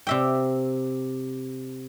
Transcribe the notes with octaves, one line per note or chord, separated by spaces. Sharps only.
C3 E5 G5